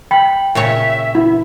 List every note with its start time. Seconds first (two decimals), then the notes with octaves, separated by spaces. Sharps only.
0.11 G5 B5
0.55 A#2 C#3 C#5 E5
1.15 E4